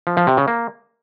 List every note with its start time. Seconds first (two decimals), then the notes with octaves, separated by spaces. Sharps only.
0.07 F3
0.17 F3
0.27 C3
0.37 C#3
0.48 A#3